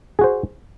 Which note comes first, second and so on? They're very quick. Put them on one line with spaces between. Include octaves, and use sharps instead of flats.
G#4 F#4 C5